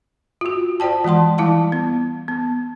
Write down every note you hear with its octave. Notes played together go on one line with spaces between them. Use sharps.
F4 F#4
F4 C5 D5 G5 A5
E3 G#3 F#5 A5 C6
E3 G3 E4 F5 A5
B3
B3